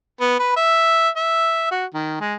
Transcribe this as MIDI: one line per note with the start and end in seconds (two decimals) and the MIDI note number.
0.21 0.37 59
0.39 0.55 71
0.56 1.09 76
1.16 1.70 76
1.71 1.85 66
1.94 2.15 51
2.20 2.35 56